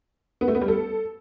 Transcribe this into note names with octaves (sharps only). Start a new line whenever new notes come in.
B3
A3
B3
G3
A4